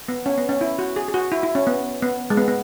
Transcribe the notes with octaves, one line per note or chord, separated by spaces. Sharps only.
B3
C#4
B3
C#4
E4
F#4
G#4
G#4
F#4
E4
E4
C#4
B3
B3
G#3
B3
B3